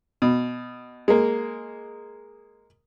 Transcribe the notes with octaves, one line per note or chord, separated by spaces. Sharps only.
B2
G#3 A#3